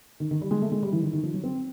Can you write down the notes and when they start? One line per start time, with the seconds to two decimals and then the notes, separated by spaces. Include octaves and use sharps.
0.20 D#3
0.31 D#3
0.41 G3
0.51 G#3
0.62 A3
0.72 G#3
0.83 G3
0.92 E3
1.02 D#3
1.13 D#3
1.24 F3
1.34 F#3
1.44 C4